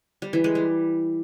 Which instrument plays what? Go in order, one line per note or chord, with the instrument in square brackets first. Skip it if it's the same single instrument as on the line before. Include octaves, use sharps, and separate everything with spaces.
[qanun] G3
E3
G#3
G3